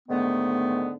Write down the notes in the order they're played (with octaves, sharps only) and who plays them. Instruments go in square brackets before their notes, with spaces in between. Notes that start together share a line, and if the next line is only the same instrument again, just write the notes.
[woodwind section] G#2 D3 D#3 A3 B3